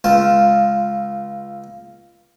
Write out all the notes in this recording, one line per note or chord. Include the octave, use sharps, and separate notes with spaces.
C#2 F4 A5